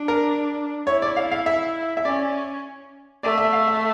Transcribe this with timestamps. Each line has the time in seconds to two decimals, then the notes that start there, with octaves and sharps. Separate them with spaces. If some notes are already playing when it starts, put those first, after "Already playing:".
Already playing: D4
0.08 A#4
0.87 E4 C#5
1.02 D5
1.16 F5
1.31 F5
1.46 E5
1.97 E5
2.05 C#4 D5
3.23 A3 D5
3.38 E5
3.53 F5
3.67 E5